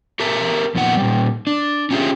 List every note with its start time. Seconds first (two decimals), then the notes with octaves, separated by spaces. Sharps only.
0.20 G4 A4 A#4 E5 A5
0.75 F2 A#2 D#3 B3 F#5
0.97 A#2 G3
1.47 D4
1.91 C#4 E4 F4 G4 G#4 E5